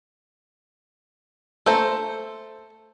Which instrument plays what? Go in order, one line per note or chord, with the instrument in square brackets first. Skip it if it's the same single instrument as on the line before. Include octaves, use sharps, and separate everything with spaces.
[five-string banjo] A3 C5 A#5 [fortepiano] A4